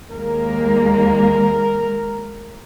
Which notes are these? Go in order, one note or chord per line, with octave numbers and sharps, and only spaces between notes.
D#2 G#3 A#3 A#4